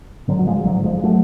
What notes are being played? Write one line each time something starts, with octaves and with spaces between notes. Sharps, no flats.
A1 G#2 D3 F#3
F#3
F3 G#3
G#1 G#2 D3 F#3
F3 G#3
F#3 A3